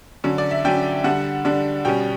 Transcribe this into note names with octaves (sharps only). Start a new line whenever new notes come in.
D3 F#3 C#4
D5
E5
D3 F#3 C#4 G5
D3 G3 D4 F#5
D3 G3 D4
B2 G3 C#4 G5